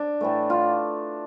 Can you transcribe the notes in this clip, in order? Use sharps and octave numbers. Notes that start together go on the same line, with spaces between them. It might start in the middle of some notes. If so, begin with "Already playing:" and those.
Already playing: D4
A2 E3 A3
F4